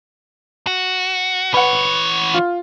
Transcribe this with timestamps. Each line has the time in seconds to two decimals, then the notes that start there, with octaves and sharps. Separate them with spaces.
0.67 F#4
1.54 E3 B4 C#5 F#5
2.34 F4